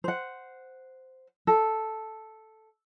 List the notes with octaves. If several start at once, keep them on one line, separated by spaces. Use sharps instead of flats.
C5 F#5
A4